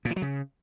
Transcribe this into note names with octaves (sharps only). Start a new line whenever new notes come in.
A#2
E3
F#3
C#3